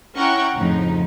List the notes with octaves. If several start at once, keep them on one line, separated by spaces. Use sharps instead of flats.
C#4 E4 F#5 G5 A#5 C#6
F2 A2 C#3 F3 D#4